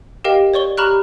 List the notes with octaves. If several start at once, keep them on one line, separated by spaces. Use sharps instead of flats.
G4 A#4 D#5 F5 G5
C#5 D5 C#6 G7
G4 A#5 B5 C#6 F6 F#6